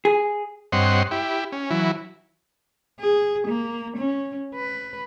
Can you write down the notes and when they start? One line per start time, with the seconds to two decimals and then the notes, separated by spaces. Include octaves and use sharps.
0.05 G#4
0.72 G2 C4 C#5 D#5 F#5 C6
1.11 E4 G4
1.52 C#4
1.70 E3 F#3 E4
3.00 G#4
3.48 A#3
3.98 C#4
4.55 B4